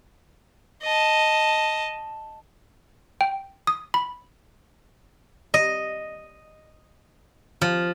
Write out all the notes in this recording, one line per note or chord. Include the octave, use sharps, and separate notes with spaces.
D#5 A5
G5
D#6
B5
D#5
F3